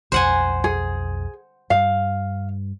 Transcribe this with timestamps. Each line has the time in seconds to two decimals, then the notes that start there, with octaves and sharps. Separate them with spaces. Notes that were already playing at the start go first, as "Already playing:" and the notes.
0.12 B1 F2 C5 F#5 G#5
0.64 G#4
1.70 G2 G3 F5